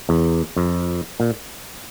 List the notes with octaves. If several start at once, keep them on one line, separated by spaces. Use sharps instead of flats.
E2
F2
A#2